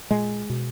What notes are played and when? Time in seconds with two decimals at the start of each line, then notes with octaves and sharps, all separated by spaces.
0.11 A#2 G#3
0.50 B2